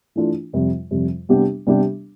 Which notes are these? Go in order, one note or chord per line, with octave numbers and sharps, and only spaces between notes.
E3 A3 D4 F4
F2 C3 G3
F2 C3 G3
C3 G3 B3 D4 G4
C3 G3 B3 D4 G4